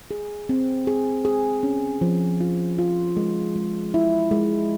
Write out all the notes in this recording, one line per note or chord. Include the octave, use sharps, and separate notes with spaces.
G#4
C4
G#4
G#4
C#4
F3
F4
F4
G#3
G#3
E4
G#3